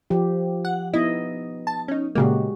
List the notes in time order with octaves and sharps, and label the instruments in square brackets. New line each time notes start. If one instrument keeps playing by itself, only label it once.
[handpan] F3 G4
[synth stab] F#5
[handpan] B3 D#4 D#5 [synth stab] E4
[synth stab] A5
C#4 D#4
[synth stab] A#2 C#3 A#3 [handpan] G#3 F#4 G4